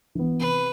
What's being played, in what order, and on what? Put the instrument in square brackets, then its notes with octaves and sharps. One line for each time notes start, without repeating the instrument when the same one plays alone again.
[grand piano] E3 B3
[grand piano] C3 [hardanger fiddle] B4